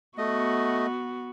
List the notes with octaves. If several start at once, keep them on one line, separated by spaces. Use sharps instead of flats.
A3 B3 F#4 D#5